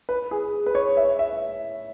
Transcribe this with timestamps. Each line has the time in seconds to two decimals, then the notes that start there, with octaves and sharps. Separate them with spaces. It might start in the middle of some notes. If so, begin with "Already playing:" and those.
0.09 B4
0.31 G#4
0.66 B4
0.75 C#5
0.97 E5
1.19 E5